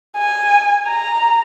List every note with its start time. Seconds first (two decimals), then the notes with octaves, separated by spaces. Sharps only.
0.17 G#5
0.88 A#5